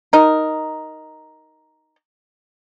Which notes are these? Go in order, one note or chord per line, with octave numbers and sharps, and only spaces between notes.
D#4 A#4